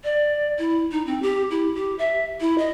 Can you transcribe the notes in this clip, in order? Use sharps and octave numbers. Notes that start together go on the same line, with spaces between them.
D5
E4
D#4
C4
G4
E4
G4
E5
E4
D#5